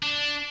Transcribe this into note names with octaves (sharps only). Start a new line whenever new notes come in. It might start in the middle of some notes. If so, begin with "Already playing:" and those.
D4